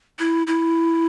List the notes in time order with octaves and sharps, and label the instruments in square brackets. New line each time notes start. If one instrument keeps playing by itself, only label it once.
[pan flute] E4
E4